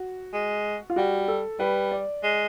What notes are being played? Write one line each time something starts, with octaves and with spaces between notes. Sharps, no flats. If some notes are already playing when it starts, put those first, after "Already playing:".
Already playing: F#4
G#3
F4
G3 F#4
A4
G3 B4
D5
G#3